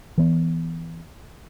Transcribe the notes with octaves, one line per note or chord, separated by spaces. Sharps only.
E3 B3